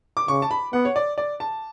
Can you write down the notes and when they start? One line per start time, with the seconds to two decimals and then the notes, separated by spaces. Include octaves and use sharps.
0.17 D6
0.28 C#3 C#6
0.42 A5
0.51 B5
0.73 B3 F#5
0.85 C#5
0.96 D5
1.18 D5
1.40 A5